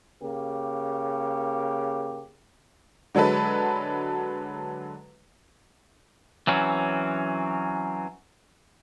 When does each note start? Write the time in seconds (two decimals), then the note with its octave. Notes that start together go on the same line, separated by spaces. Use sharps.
0.22 C#3 A#3 G4
3.15 D3 F#3 G#3 A4 B4
6.47 E3 F#3 C4 C#4